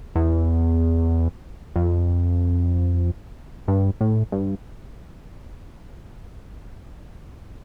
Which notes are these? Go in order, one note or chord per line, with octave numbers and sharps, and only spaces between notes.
E2
F2
G2
A2
G2